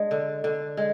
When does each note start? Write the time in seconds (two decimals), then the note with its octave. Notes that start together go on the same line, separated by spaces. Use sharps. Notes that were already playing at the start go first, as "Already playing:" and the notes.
Already playing: G#3 D4
0.11 D3
0.44 D3
0.77 G#3